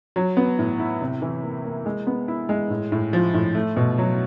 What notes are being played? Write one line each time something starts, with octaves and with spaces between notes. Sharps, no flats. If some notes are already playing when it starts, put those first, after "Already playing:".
F#3
B3
A2
E4
C3
E3
A#3
A#3
G#3
B3
E4
G#3
A2
A2
F3
A2
A3
B2
F#3